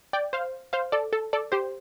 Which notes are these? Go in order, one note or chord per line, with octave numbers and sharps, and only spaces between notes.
D5 G5
C5 F5
C5 F5
A4 D5
A4
A4 D5
G4 C5